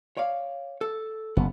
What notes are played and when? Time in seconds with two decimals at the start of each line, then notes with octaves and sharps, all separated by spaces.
0.17 C#5 D5 F5
0.81 A4
1.37 F#1 B3